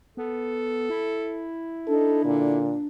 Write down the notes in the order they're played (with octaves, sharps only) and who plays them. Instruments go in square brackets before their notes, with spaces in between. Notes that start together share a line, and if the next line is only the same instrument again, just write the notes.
[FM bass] B3 [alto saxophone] A4
[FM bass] E4
[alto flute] D4 [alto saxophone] D#4 [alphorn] A4
[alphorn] A#2 [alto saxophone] D3